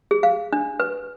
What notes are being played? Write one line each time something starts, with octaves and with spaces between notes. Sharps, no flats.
G#4
F5
D4
B4